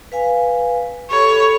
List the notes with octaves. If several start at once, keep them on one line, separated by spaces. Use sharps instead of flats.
B4 F5 G#5
G4 A4 C#5 B5